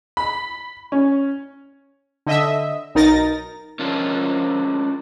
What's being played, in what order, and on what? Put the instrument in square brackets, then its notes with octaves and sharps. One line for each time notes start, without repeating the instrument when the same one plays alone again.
[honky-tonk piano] B5
C#4
[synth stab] D3 D#5 E5
B1 D#4 A#4 A6 A#6
[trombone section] F3 A#4 [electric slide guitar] C#4 D4 F4